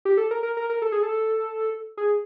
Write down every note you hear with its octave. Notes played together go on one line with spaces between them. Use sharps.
G4
A4
A#4
A#4
A#4
A#4
A4
G#4
A4
G#4